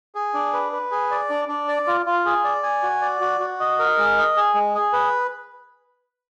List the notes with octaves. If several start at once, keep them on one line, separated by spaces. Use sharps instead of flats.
G#4
D4
B4
B4
G#4
D5
D4
D4
D5
F4
F4
G#4
D5
G#5
F#4
D5
F#4
F#4
D#5
A#4
G#3
D#5
G#4
G#3
G#4
B4